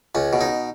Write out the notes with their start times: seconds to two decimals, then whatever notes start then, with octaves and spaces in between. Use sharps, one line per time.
0.15 C#2 C#4
0.33 B2
0.41 D#4